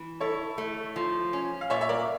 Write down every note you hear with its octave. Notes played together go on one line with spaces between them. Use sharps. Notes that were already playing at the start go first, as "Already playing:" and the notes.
Already playing: E3
E4 A4 C#5
A3
F3
C#4
F5
A#2 C#5 E5
E5
A#4 D5